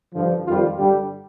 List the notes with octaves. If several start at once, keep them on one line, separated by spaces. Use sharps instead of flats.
G2 D3 F3
F2 D#3 G3 F4
G2 D3 G3 G4